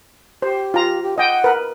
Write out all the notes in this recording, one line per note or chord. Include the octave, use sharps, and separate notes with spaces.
G4 C5
F4 A#5
G4
D#5 F#5 G5
A#4 B4